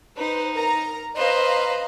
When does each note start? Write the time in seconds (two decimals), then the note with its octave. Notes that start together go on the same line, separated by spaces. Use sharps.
0.17 D#4 B4 C5
0.53 A#4 A#5
1.17 B4 C5 D#5 F5 A#5